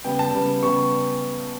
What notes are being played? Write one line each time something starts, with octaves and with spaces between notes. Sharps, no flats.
C#3 G3 B3 G5
A5
C#3 G3 B3
C#3 G3 B3 C#6